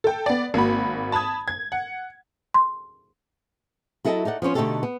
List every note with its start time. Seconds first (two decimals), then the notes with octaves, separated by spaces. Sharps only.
0.04 A4 G5
0.26 B3 D5
0.54 G#1 A#3 F#4 B5
1.12 A5 B5 D#6 G#6
1.48 G#6
1.72 F#5
2.54 C6
4.05 F#3 E4 A4 D#5 G5 A5
4.25 D#4 A4 D5 F#5
4.42 F3 B3 C#4 C5
4.55 B2 D3 A3 D#4 G4 A4
4.83 B3